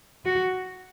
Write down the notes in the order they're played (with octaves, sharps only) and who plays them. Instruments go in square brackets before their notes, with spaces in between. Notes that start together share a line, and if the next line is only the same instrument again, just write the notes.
[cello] F#4